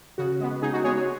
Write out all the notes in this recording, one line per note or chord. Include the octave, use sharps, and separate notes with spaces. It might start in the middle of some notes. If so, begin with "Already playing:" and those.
C#3 F#4
G#3 B3
C#3 D#4 G#4
F#4
G#3 B3 G#4 C#5
F#4